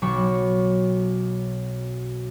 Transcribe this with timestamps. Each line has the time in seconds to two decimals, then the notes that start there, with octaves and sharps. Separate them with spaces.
0.02 B1 F#3 B5 C#6 D6 E7